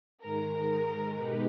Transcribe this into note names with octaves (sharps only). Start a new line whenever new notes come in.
G#2 D#3 G#3 A#4
B2 G#3 D#4 G4 B4